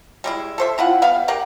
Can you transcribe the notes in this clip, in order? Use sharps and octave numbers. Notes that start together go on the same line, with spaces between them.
G3 G#3 E4
A4 C5 E5
C4 E4 F4 F#5
G3 B3 F5
G4 A#4 F5 F#5